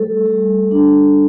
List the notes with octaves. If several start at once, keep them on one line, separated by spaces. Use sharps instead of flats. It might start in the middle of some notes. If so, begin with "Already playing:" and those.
Already playing: G3 A3 A4
G3
D4